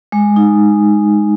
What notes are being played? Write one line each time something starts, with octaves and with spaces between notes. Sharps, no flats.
G#3
D#4